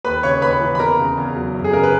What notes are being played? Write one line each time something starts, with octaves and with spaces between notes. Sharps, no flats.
D#2 B4 B5
C#3 C#5 C#6
D#2 B4 B5
E3
B5
E2 A#4 A#5
C#3
E2
F#3
F#2
G#4
C#3 A#4
B4